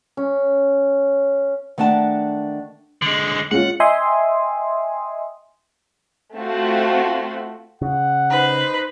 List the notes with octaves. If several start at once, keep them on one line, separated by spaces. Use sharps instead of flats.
C#4
D#3 A3 D4 F#5 A5
D3 G#3
G#3 C#4 F4 F#5
D#5 E5 G5 G#5 C6 D#6
A3 C4 F4 F#4
C#3 F#5
D#4 B4 C5